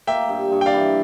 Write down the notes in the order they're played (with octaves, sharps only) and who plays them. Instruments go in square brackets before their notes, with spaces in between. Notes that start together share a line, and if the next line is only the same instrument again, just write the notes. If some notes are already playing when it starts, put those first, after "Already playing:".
[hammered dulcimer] A#3 [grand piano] E5 G5
[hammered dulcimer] G2
G2
[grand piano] G5
D5 F5
[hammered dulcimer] E3